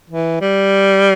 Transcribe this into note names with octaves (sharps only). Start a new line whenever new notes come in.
E3
G3